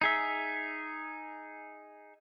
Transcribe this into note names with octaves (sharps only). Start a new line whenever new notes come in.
D#4 G#4 E5